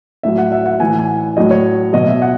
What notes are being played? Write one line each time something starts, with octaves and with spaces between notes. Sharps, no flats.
A2 F#3 E5
F#5
E5
F#5
A2 E3 G#5
G#5
A2 F#3 D#5
C#5
B2 F#3 D#5
E5
F#5